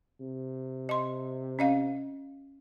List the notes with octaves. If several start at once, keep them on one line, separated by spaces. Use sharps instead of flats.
C3
D#5 C6
C#4 D#5 F5